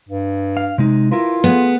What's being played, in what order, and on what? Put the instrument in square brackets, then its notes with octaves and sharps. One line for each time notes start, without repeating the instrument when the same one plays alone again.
[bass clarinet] G2
[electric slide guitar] F5
C3 G#3 D#4
[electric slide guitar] E4 A#4 B4 [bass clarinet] F4
[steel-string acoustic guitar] B3 [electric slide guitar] G#4